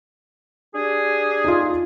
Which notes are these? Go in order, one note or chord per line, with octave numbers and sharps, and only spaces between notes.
D4 G4 G#4
D#4 F4